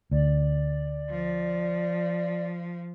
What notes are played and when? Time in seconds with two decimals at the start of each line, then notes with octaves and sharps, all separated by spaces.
0.11 D2 D5
1.09 F3